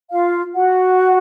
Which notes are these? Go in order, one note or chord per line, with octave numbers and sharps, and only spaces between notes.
F4 F5
F#4 F#5